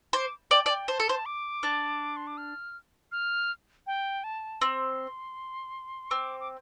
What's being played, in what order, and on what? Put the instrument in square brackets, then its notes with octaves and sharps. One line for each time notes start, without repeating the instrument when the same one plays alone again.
[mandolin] C5 [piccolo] D6
[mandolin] D5 [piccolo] G5
[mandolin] D5 [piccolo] A5
[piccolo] G5
[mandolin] C5 [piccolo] A5
[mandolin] A4
C5
[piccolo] D6
[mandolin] D4
[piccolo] C6
D6
F6
F6
G5
A5
[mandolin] C4 [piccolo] C6
[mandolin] C4 [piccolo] D6
[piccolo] D6